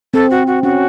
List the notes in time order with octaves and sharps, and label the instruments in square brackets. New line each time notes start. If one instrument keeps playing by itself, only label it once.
[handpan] C4 [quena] A4
[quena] F#4
F#4
[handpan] C#4 [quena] F#4